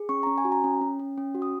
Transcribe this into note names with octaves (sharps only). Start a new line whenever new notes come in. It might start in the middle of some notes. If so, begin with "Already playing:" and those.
Already playing: G#4
C#4 C#6
C#4 A#5
G#5
F#4
A#5
C#4
C#4
C#4
C#4
F#4
D#6